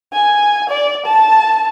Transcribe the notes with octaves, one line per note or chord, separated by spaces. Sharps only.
G#5
D5
A5